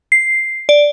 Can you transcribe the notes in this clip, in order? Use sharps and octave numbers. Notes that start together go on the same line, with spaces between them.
C7
D5